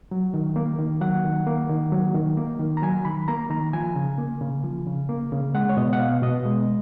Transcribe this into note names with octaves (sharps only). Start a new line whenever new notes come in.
F#3
D#3
A#3
D#3
F#3 F#5
D#3
A#3
D#3
F#3
D#3
A#3
D#3
A#5
F#3 G#5
D#3 B5
A#3 A#5
D#3 A#5
F3 G#5
C#3
A#3
C#3
F3
C#3
A#3
C#3
G#3 F#5
C#5
B2 D#5
F#5
B3 F5
B2 D#5
G#3